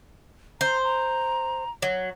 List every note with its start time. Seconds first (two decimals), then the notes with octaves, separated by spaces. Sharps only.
0.61 C5 A#5
0.84 A#5
1.82 F#3